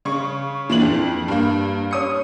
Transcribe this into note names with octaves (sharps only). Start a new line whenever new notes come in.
C#3 C#6
A#2 E3 D4 F#7
F2
G2 A#3
C#4 D#6 C#7